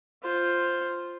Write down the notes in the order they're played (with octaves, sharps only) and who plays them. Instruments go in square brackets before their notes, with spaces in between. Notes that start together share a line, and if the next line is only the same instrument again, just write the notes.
[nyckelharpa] F4 C5